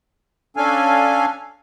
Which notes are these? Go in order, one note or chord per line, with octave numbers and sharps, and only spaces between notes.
C#4 D4 A4 F5 G#5